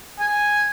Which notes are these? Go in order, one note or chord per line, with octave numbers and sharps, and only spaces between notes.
G#5